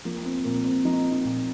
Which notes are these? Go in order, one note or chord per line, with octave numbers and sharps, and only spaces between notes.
F3 A#3
C4
A#2 A#3
C4
F3 D#4
D#4
A#2